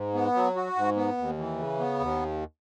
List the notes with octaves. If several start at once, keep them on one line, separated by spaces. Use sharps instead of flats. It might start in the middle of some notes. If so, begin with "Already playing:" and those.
Already playing: G#2
B3
F#3
F#4
G#2
B3
D#2
E3
C#3
B3
D#2